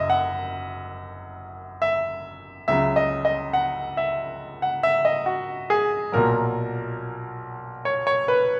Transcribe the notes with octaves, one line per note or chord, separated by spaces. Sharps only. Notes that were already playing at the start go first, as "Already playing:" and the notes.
Already playing: F#1 F#2 D#5 E5
F#5
E5
C#2 C#3 F#3 E5
D#5
D#5
F#5
E5
F#5
E5
D#5
F#4
G#4
B1 A#2 F#3 A#4
C#5
C#5
B4